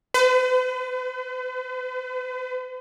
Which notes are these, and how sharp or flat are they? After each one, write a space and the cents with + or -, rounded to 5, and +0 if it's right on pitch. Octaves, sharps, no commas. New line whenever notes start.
B4 +45